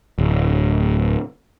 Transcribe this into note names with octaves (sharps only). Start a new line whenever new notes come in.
D1